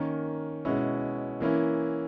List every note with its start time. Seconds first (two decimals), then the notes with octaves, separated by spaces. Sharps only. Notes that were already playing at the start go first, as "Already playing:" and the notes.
Already playing: D#3 A#3 C#4
0.65 B2 G#3 C#4 E4
1.40 E3 A#3 C#4 E4